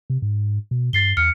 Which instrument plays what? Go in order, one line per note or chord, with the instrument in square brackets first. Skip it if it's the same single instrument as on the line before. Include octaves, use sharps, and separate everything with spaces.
[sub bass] C3
G#2
B2
[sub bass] G2 [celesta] A6 C7 G7
[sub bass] E2 [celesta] F6 C#7